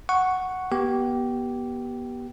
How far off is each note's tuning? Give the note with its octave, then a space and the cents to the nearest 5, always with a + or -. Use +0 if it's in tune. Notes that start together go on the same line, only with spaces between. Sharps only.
F#5 +0 C#6 +0
B3 -30 G4 -15